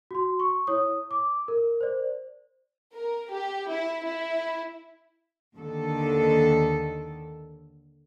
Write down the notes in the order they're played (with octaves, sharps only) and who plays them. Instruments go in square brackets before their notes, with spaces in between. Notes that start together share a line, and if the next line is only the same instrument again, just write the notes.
[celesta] F#4 C6
C#6
E4 C#5 D#6
D6
A#4
C5 D5
[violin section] A#4
G4
E4
E4
[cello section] D#2 D3 D#3 A4